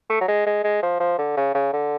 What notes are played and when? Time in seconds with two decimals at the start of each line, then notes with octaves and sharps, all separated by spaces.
0.10 A3
0.21 F#3
0.28 G#3
0.46 G#3
0.64 G#3
0.82 F3
1.00 F3
1.18 D3
1.36 C#3
1.54 C#3
1.73 D3